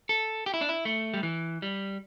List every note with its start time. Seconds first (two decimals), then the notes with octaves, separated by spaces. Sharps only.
0.09 A4
0.46 G4
0.54 E4
0.61 D4
0.69 E4
0.85 A3
1.14 G3
1.23 E3
1.62 G3